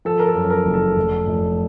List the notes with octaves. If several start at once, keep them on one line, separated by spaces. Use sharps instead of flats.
F3 A4
A#4
A4
F#2
A#4
F#1
A4
F1
F1